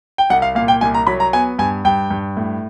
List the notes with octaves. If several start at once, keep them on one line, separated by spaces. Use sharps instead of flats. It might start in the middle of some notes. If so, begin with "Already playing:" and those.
G5
C2 F#5
F5
A#2 F5
G5
C2 G#5
A#5
F#3 B5
A#5
B3 G#5
G2 G#5
G2 G5
G2
A2